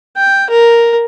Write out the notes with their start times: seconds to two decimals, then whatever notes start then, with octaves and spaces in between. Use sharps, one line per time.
0.17 G5
0.50 A#4